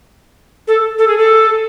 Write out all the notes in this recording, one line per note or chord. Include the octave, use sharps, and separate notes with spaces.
A4
A4
G#4
A4